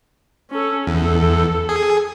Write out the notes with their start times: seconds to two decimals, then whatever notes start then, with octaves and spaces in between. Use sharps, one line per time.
0.51 C#4 A4
0.87 E2 A4
1.69 G#4